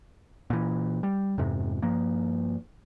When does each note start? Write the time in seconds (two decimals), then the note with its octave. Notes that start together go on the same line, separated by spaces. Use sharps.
0.50 A#2 E3
1.03 G3
1.38 F2 G#2 C3
1.82 G2 F3 A#3